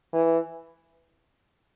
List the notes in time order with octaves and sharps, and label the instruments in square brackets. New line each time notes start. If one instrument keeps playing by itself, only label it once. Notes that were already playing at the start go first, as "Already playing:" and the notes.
[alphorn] E3